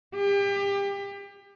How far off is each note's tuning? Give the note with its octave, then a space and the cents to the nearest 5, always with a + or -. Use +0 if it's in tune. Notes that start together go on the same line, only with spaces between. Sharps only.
G4 +30